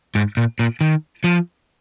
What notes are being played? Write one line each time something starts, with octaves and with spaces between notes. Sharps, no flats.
G#2
A#2
A#2
D#3
F3